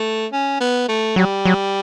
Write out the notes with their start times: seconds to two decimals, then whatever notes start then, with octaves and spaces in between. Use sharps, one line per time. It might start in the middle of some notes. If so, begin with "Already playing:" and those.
Already playing: A3
0.32 C#4
0.60 B3
0.89 A3
1.16 F#3 G3
1.45 F#3